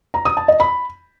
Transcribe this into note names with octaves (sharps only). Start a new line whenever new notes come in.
A#5
D#6
A5
D#5
B5